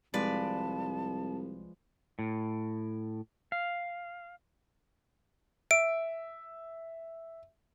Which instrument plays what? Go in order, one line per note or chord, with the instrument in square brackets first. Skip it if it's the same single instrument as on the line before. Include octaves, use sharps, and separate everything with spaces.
[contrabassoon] C2 [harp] F3 G#3 [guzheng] B4 D5 [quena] A5
[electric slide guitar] A2
F5
[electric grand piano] E5 [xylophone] D7